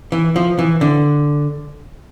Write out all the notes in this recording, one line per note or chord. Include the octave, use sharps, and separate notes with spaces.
E3
F3
E3
D3